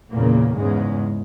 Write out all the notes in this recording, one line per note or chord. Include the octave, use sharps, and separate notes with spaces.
E2 A#2 C#3 A#3
E2 G#2 C#3 G#3